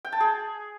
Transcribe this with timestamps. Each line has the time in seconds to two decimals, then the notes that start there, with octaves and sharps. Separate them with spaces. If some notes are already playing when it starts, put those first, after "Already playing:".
0.05 G5
0.12 A5
0.20 G#4